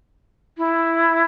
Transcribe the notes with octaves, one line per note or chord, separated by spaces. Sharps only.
E4